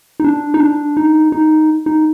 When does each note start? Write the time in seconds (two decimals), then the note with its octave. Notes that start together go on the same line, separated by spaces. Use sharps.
0.20 D#4
0.24 D4
0.54 D#4
0.61 D4
0.97 D#4
1.32 D#4
1.86 D#4